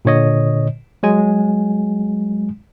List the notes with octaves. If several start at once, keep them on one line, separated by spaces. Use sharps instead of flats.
A#2 D3 C#5 D#5
F#3 G#3 G#5